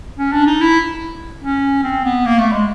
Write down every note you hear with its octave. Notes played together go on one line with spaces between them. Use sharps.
C#4
D4
D#4
E4
C#4
C4
B3
A#3
A3
G#3